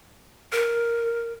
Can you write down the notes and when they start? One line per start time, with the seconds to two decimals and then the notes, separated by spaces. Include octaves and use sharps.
0.52 A#4